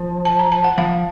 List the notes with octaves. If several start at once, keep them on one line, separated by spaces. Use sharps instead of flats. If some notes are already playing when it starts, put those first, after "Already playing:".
Already playing: F3
A5
A#5
A5
F#5
F3 F5